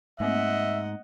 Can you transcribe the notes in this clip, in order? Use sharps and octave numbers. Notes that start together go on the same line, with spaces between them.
G#2 A3 A#3 C4 D#5 E5 F#5